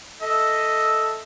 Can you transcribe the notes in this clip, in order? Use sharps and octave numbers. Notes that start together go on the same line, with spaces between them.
A4 D#5 E5